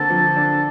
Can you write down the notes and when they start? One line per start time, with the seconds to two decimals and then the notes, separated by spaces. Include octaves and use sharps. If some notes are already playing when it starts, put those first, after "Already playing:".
Already playing: D3 A#3 C4 A4
0.10 F3
0.37 D4